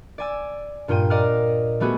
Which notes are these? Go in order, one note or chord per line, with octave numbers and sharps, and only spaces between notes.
D5 G#5 E6
G2 A#2 F4 G5 D#7
A#4 D5 D#5 F5 F#5 F6
G3 A3 B3 F#4 G#4